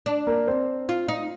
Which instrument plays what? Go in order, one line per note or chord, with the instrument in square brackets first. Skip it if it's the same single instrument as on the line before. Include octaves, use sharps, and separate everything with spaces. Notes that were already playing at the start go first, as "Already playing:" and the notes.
[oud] D4
[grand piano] A#3 A#4
C4 C5
[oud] F4
D#4